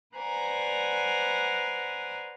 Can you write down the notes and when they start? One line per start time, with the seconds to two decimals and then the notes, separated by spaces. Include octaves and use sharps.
0.16 B4 C5 D5 F#5 G#5 A#5